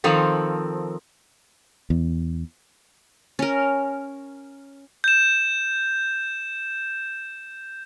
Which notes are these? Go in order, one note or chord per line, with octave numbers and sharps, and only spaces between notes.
D#3 F3 C4 A4
E2
C#4 A#4
G6 E7